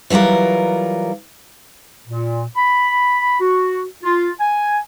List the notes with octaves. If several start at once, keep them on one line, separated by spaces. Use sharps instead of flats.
E3 F#3 G3 F4 A#4
A#2
B5
F#4
F4
G#5